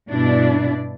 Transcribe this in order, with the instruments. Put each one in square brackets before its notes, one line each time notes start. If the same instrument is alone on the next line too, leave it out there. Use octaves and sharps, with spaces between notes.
[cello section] G2 B2 D4 E4 D5